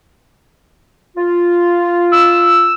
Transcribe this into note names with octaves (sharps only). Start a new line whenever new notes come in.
F4
E6